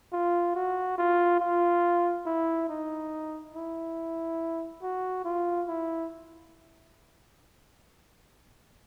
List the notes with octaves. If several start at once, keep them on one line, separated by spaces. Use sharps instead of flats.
F4
F#4
F4
F4
E4
D#4
E4
F#4
F4
E4